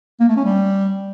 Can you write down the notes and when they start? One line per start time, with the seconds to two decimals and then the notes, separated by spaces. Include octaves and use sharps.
0.20 A#3
0.28 A3
0.37 C#4
0.45 G3